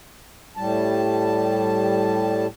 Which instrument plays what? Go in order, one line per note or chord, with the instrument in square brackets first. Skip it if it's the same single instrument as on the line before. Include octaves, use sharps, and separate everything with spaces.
[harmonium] A2 G3 A5